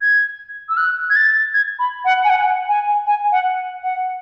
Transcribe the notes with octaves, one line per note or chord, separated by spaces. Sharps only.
G#6
E6
F#6
G#6
A6
G#6
B5
F#5
G#5
F#5
G#5
G#5
F#5
F#5